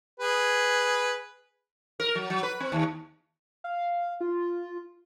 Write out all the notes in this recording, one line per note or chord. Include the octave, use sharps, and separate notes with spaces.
G#4 B4
A#4
F#3
F#3
B4
C4
D#2
F5
F4